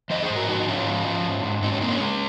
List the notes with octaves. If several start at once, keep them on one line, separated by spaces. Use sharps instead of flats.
F3 C5 D#5
G#4 C5
G#2
F#4 A#4
F3 D#4 F#4
G#2 C#4 F4
F3
F3
G#2
G#2
G#2 C4 D#4
C#4
A#3 C4 D#4
C#4
G#3